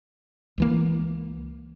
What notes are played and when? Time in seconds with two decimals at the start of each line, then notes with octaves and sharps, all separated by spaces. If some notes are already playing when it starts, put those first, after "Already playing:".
0.58 C#2 E3 A#3